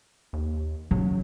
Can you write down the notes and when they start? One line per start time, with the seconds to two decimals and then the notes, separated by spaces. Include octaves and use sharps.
0.33 D#2
0.91 C#3 F#3